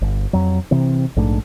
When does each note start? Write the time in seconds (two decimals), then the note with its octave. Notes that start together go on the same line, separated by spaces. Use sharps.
0.01 G1
0.33 F2 F#3
0.71 C3 E3 C4
1.16 A#1 G#2 A3 D4